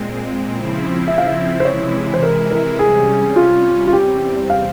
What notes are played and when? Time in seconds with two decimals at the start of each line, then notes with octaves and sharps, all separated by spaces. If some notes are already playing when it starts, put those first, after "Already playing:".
Already playing: A#2 G#3 C4
0.51 C#3 F3 C4 E4
1.08 E5
1.18 F5
1.27 E5
1.60 C5
1.65 C3 E3 G#3 E4 C#5
2.14 C5
2.23 A#4
2.51 A#4
2.79 C3 G3 C#4 G#4
3.36 F4
3.87 F4
3.92 E2 C3 G3 C4 G4
4.50 F5